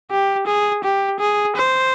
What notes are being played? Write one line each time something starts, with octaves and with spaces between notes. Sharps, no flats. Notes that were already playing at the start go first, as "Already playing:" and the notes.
G4
G#4
G4
G#4
C5